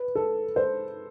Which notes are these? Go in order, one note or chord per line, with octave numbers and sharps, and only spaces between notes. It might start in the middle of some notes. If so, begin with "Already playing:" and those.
Already playing: B4
A4
C5